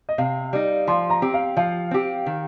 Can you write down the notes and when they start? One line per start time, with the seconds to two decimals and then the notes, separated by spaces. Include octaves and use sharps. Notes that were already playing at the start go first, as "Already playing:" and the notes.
0.09 D#5
0.18 C3 F5
0.53 G3 D#4
0.87 F3 C6
1.10 A#5
1.22 C4 G4
1.34 F5
1.57 F3 F5
1.91 C4 G4
2.26 D#3